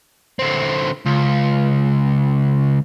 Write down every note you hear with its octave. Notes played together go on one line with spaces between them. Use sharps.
D3 C4
C#2